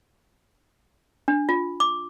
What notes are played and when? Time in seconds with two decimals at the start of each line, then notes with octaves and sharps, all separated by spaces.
1.28 D4
1.49 F4
1.80 D6